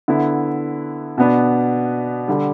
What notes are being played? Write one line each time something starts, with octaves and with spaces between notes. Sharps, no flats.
D3 B3 E4
B2 B3 D4
D3 G3